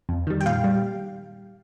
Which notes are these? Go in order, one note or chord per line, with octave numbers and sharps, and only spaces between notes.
F2
D#3 G3
G5
A#2 F5
G3